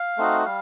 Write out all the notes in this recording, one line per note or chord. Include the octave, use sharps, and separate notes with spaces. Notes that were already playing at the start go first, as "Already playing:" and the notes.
Already playing: F5
A3 C4 D#4 F#4
G3 F5